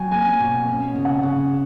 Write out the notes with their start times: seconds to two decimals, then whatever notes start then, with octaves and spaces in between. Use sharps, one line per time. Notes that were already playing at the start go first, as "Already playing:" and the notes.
Already playing: F#3 G5 G#5
0.11 A#3 G#5
0.40 B2
0.68 C#4
0.96 C#3
1.05 F#5
1.23 C#3